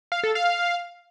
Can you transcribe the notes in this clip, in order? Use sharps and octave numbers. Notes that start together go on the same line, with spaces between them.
F5
A4
F5